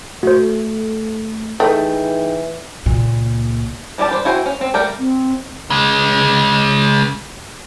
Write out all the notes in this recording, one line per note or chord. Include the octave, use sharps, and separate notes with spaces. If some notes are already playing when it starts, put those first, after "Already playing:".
A3 F#4 A4 C5
E3 A3 D#4 G#4 G5
C#2 A#2
E3 G3 C#4 G4 A5
B4 C5
E4 F#4 C5 G5 G#5
C#4
C4
G3 A3 A#4 G5
C4
C#3 G#3